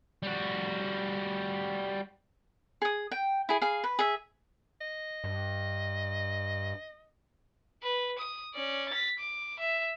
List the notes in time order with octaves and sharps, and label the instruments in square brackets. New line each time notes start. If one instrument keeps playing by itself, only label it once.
[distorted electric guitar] G3 F#4
[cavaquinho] G#4 D#6
G5
E4 G#4
G#4 F5
B4
G#4 E5
[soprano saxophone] D#5
[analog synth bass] G2
[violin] B4
D#6
C#4 D5
A6 B6
D6
E5